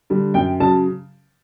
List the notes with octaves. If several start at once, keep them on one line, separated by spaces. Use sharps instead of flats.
D3 G3
F#2 G5
C#3 F#3 A5